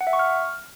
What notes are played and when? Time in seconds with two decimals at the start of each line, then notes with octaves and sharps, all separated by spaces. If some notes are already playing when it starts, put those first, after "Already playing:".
0.01 F#5
0.07 E5
0.13 C#6
0.19 F6